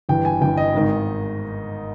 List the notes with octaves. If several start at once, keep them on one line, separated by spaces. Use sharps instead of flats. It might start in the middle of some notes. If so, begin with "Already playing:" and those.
G1 G2 E3 G5
G#5
G1 G2 E3 G5
D#5
G#1 G#2 D#3